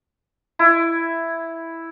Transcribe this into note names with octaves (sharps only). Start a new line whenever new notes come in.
E4